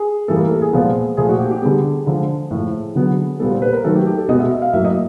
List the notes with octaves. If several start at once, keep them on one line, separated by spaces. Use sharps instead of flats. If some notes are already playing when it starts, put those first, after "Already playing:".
Already playing: G#4
A2 E3 G3 A#3 A4
A#4
A4
G#4
A#2 F3 G#3 B3
A#2 F3 A3 G#4
F#4
G4
G4
D3 G3 B3 G#4
D3 F3 G#3
A2 F3 A3
D3 F#3 B3
A#2 G3 B3 A4
C5
B4
A#4
D#3 F#3 A3 A4
G4
G4
A4
B2 G#3 B3 D#5
E5
E5
F5
A2 F#3 A#3 E5
D#5